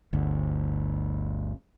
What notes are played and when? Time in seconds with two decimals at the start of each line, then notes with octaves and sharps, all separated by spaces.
0.13 G1 D2